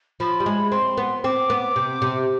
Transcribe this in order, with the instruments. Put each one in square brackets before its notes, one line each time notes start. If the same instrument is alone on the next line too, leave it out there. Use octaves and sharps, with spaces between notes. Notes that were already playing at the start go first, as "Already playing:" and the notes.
[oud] F3 [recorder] B5
[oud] G3
G#3
[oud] C4 [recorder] C6
[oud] B3
[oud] C4 [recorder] D6
[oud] B3
C3
C3